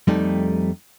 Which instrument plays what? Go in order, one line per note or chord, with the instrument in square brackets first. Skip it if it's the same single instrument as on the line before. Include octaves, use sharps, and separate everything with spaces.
[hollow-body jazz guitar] F2 G3 A3 D#4